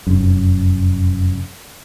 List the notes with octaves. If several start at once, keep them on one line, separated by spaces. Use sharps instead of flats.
F1 F#2